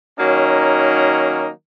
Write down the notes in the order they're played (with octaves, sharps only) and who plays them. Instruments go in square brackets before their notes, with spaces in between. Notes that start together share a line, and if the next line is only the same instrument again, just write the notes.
[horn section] D#3 F#3 A#3 C#4 D#4